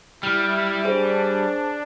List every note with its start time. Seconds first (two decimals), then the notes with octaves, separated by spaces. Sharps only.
0.23 G3 E4 F6
0.85 D4 G#4 C5